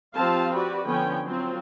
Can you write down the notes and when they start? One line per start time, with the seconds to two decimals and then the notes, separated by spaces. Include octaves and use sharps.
0.15 F3 C4 F4 G4 F5 A5
0.54 F#4 G4 B4 D5
0.87 D3 F3 B3 C#4 G5
1.26 F#3 C4 F4